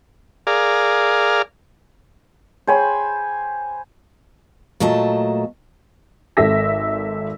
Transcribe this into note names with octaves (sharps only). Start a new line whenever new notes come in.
G#4 A#4 D5 F5
G#4 C5 C#5 G5 G#5 B5
A#2 F#3 A3 D#5 A5
G#1 A4 E5 E6 A#6 B6